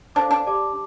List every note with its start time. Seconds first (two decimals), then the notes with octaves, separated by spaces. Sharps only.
0.15 D4 A4 C5 F5 A5 D6
0.31 D4
0.46 G4 D5 A5 D6